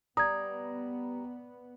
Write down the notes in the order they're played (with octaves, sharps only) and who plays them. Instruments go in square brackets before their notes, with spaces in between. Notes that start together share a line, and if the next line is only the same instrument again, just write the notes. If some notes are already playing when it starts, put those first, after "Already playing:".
[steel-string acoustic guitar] G3 [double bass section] B3 [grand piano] A#5 [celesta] D#6 G#6